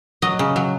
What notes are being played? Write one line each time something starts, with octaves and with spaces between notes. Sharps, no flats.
F#3 D#5
C#3
F#3